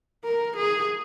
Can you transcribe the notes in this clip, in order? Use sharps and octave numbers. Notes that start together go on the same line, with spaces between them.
A#4
G#4